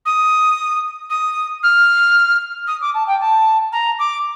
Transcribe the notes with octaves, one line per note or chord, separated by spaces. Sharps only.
D#6
D#6
F6
D#6
D6
A5
G5
A5
A#5
D6